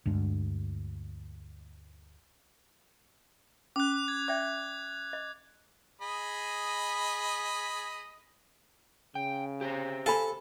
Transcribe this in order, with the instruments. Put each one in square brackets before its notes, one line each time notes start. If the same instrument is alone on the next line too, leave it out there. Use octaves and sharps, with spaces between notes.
[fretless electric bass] D2 G2 G#3 D4
[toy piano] C#4 [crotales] D6 F#6
[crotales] G#6
[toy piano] D5 E5 G5 [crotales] D6
[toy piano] D#5
[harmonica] G#4 D#5 B5
[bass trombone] C#3 [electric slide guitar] G5
[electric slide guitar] G4 C5 A#5
[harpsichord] A4 [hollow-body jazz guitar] F5 G#5 B5